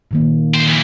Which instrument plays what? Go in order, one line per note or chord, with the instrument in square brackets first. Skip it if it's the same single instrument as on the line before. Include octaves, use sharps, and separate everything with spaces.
[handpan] A#2 D#3 A#3
[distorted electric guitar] C#2 C5
F2 E3